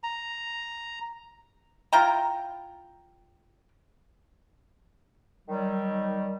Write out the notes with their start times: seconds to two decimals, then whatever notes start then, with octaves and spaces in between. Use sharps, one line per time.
0.03 A#5
1.93 E4 F4 G5 A#5
5.48 D#3 F#3 G3